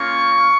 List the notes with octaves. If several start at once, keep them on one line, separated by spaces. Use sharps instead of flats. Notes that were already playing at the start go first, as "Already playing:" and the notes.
Already playing: A#3 C#4 F4 C#6